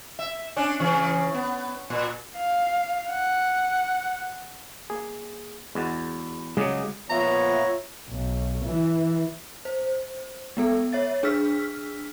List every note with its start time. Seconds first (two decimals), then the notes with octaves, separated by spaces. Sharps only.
0.19 E5
0.56 C#4 D4
0.80 C#3 E3 C#4
1.34 B3
1.90 A#2
2.38 F5
3.11 F#5
4.90 A#3 G#4
5.75 E2 G#3 F#4 A6
6.57 C#2 C#3 F#3 G#3 D6 D#6
7.10 A#2 F3 B3 F4 C#5 E5 A#5
8.09 B1
8.66 E3
9.65 C5
10.57 G#3 B3 A4
10.93 C#5 E5 A6
11.23 D4 G#4 E6 F6 B6